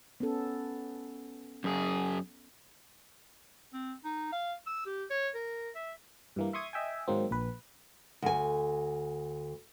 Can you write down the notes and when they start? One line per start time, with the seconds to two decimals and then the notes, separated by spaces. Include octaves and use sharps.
0.20 B3 C#4 A4
1.64 F#2 G#4
3.73 C4
4.05 D#4
4.33 F5
4.67 E6
4.86 G4
5.10 C#5
5.34 A#4
5.75 E5
6.36 G2 E3 A#3
6.53 E5 C6 C#6 D#6 G#6
6.73 D#5 E5 G5 G#5
7.08 G#2 D#3 F#3 A#3 C4
7.31 A#1 B4
8.22 D2 G#5